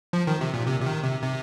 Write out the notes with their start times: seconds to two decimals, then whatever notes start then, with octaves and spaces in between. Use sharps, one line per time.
0.13 F3
0.27 D#3
0.41 C3
0.54 A#2
0.67 C3
0.81 C3
0.86 D#3
1.04 C3
1.23 C3